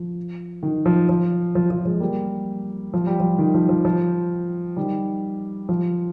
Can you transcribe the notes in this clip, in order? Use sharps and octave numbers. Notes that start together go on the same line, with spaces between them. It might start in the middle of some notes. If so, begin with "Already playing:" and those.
Already playing: F3
D#3
F3
F3
F3
F3
F3 G#3
G3 A#3
F3
G3
F3
D#3
F3
F3
F3
D#3 G3
F3